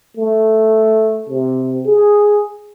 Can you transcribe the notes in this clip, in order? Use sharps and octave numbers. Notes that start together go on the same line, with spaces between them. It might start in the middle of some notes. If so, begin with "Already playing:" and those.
A3
C3
G#4